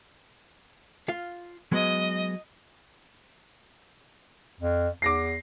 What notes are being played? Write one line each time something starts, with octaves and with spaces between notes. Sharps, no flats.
F4 F5
F#3 G#3 B3 D#5
F2
E2 D6 A#6 C7